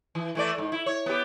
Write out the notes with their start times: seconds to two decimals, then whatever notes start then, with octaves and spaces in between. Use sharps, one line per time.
0.15 E3
0.35 E3 A3 D5
0.58 G#2
0.72 E4
0.86 C#5
1.06 B3 G4